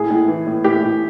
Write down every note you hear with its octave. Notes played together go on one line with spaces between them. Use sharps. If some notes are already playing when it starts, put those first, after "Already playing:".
Already playing: A2 G#4
A2
E3
A2
A2 G4
A2